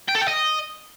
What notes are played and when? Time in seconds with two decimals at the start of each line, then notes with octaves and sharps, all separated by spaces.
0.08 G5
0.15 A4
0.21 G5
0.28 D#5